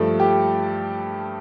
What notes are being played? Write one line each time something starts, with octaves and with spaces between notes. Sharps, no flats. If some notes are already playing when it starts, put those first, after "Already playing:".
Already playing: G2 F3 A3 A4
G4